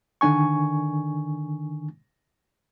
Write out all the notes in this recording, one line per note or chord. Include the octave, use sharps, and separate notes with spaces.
D3 D#3 D4 G#5 C#6